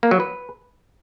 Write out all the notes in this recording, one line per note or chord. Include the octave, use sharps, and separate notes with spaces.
A#3
F#3
B4